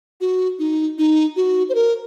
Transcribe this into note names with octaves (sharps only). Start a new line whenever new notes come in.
F#4
D#4
D#4
F#4
C5
A#4